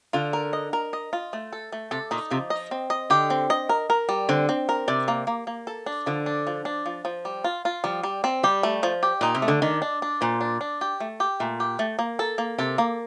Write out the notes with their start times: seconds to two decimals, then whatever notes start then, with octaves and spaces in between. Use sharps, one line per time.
0.13 D3 F4
0.33 A#4
0.53 D#5
0.73 A#4
0.93 D#5
1.13 F4
1.33 A3
1.53 A4
1.72 A3
1.91 C3 A4
2.11 A#2 D#4
2.31 C3 F3
2.50 D#5
2.71 C4
2.90 D#5
3.10 D3 G4
3.30 C4
3.50 D#5
3.69 A#4
3.90 A#4
4.09 G3
4.29 D3 C4
4.49 C4
4.69 A#4
4.88 C3 D5
5.08 A#3
5.27 A#3
5.47 A#3
5.67 A4
5.86 D4
6.06 D3 F3
6.26 D4
6.47 F3
6.65 D4
6.86 F3
7.05 F3
7.25 G3
7.44 F4
7.65 F4
7.84 F3 G3
8.03 G3
8.24 C4
8.43 G3 G4
8.63 A3
8.83 F3
9.03 G4
9.21 A#2 D#4
9.35 C3
9.42 A3
9.48 D3
9.62 D#3 D4
9.82 D4
10.02 D4
10.21 A#2 C5
10.41 D4
10.61 D4
10.81 G4
11.00 A3
11.20 G4
11.40 A#2 A3
11.60 G4
11.79 A3
11.99 A#3
12.19 A4
12.38 A#3
12.58 C3 A4
12.78 A#3